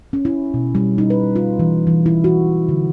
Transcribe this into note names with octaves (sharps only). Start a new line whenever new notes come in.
C#4
E4
B2
G3
D#4
B4
F4
E3
E3
E4
F#4
D3